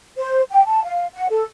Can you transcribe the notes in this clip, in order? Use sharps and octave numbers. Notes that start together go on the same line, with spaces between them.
C5
G5
A5
F5
F#5
A4